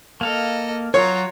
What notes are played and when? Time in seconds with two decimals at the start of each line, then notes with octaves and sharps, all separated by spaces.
0.21 A#3 A4 D#5 F5
0.94 F#3 F4 C#5 A#5